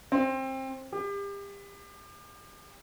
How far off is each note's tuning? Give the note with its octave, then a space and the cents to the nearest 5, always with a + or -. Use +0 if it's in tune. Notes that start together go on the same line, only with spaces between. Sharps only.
C4 +20
G4 +35